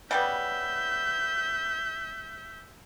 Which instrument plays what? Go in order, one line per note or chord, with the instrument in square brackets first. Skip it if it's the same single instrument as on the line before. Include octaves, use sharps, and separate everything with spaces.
[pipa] C#3 G3 B3 [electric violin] E5 G6